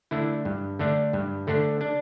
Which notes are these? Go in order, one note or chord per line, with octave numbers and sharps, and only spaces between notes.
D3 A3 D4 E4
G2
D3 A3 D4
G2
D3 A3 D4
D4